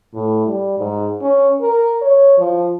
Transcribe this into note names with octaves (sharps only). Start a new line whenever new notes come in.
A2
G3
G#2
C#4
A#4
C#5
F3